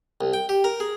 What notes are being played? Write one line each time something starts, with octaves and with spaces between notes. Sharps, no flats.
C2
G5
G4
A#4
G#4